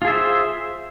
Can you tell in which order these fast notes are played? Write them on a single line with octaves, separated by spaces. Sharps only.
F4 G#4 E5 C5